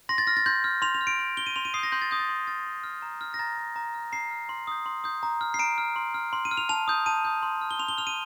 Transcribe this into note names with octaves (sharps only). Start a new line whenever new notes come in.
C6 A#6
A6
F6 A#6
A6
C6 G6
F6
C6 F7
F7
F6
D7
C6
F6 G7
D#7
C6 F7
D#7
D#6 G6 C7
A#6
C6 G6
A6
D#6 G6
A6
C6
F6 A6
C6
F6
A#5
F6
A#6
A#5 A6
F6
A#5
F6
A#5 C7
F6
C6
D#6 G6
C6
D#6 G6
A#5
F6
C7
A#5 D7
F6
C6
F6
C6
D#7
F6
F7
A5 F7
D#6 G6
A5 D#7
D#6 G6
C6
F6
G7
C6 F7
G7
F6 F7
D#7